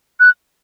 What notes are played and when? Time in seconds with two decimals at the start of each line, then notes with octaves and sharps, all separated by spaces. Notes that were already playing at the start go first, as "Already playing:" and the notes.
0.20 F#6